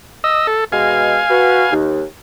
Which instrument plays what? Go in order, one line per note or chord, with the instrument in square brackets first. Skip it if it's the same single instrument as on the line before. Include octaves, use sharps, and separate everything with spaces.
[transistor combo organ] D#5 E6
A4
[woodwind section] B2 G#3 [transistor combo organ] F5 G#5
[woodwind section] F#4 B4
D#2